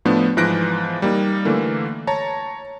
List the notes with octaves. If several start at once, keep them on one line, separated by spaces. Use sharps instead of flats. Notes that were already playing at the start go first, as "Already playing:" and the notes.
A2 F3 A3 B3 D4
G#2 E3 F3 F#6 A#6 D7
G3 A#3 D#4
D3 E3 A3 A#3
C#5 A5 A#5